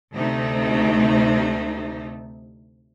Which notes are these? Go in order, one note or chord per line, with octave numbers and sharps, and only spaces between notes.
D2 C3 A3 D#4